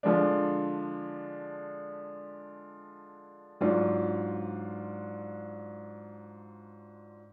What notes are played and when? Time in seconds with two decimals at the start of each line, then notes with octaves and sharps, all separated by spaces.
0.03 D3 F3 G#3 D4
3.61 G#2 F#3 D4 F4